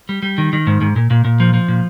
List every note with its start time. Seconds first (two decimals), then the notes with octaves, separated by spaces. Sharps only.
0.09 G3
0.23 G3
0.38 D#3
0.53 D#3
0.67 G#2
0.81 G#2
0.96 A#2
1.10 A#2
1.25 A#2
1.40 F3
1.54 F3
1.68 A#2